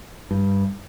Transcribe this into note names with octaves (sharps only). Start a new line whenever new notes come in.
G2